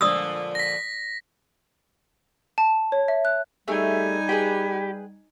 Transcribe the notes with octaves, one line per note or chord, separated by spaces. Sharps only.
A#2 D3 F3 D5 D#6 E6
A#6 B6
A5
C#5
E5
F#6
G3 A3 D#4 G4 G#4 G#5
G4 G#4 B4 G5